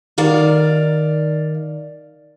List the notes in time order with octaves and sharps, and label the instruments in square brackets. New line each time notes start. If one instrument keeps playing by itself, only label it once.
[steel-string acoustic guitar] D#3 D5 F5